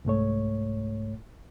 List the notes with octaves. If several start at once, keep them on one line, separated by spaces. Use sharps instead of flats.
C2 G#2 A3 C#5